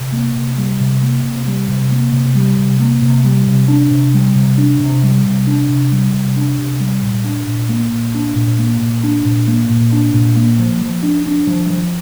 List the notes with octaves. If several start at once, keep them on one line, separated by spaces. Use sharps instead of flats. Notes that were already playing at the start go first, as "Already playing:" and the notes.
Already playing: C3
A#3
C3
G3
C3
A#3
C3
G3
C3
A#3
C3
G3
C3
A#3
C3
G3
C3
D4
C3
G3
C3
D4
C3
G3
C3
D4
C3
G3
C3
D4
C3
G3
A#2
D4
A#2
A#3
A#2
D4
A#2
A#3
A#2
D4
A#2
A#3
A#2
D4
A#2
A#3
F3
F3
D4
D4
F3
F3